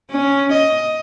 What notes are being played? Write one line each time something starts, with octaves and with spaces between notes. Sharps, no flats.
C#4
D#5